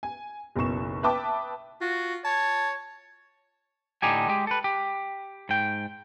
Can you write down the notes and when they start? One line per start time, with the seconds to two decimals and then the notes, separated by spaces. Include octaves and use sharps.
0.03 G#5
0.56 F#1 B1 B2 C#6 E7
1.03 B4 E5 G5 A5 D6 D#6
1.81 F4 F#4
2.25 C#5 A5
4.02 A2 D3 D#4 G4 G#5
4.28 G#3 G4
4.47 A4 B4
4.64 G4
5.49 G#2 G5